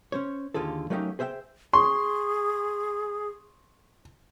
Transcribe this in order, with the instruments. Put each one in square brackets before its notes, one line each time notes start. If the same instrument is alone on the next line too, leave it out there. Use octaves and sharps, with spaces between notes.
[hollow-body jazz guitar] C#4 C5 C#5
D#2 D3 F4 G#4 A4
F#3 A3 A#3 C#4 D#4 G4
G#4 C5 E5 F5 G5
[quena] G#4 [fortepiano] C6 [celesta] C#6